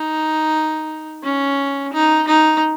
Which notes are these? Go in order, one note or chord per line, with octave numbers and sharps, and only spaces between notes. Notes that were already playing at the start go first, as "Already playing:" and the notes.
Already playing: D#4
C#4
D#4
D#4